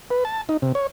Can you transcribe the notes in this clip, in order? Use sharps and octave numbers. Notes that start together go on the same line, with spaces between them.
B4
A5
D#4
C3
C#5